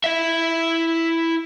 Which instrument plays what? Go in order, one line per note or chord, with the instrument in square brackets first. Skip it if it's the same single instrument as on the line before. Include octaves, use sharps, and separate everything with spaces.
[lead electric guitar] E4 E5